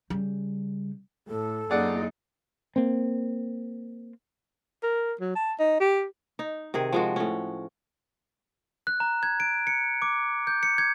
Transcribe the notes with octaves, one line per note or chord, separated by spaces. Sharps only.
C#3 G3
A2 A4
F#2 A#3 D#4 F4 G#4 D5 F#5
A#3 C4
A#4
F#3
A5
D#4
G4
D#4
C3 D#3 G#4
F3 G#3 F#4
A2 C#4
F#6
A#5
G#6
D7
C#7
D6
G6
C#7
G#6